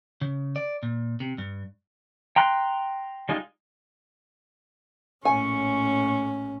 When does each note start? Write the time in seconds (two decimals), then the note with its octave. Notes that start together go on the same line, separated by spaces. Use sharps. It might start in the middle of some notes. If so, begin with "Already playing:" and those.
0.21 C#3
0.56 D5
0.83 A#2
1.20 C3
1.38 G2
2.36 G5 A#5 C6 F#6
3.29 G3 G#3 D#4 F4
5.25 A#1 A2 C#4 G#5 C#6